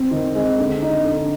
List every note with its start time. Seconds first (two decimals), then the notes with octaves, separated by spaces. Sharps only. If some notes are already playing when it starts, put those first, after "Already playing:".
Already playing: C4
0.11 D#3
0.35 G#3
0.59 D3
0.82 D#4
1.05 D3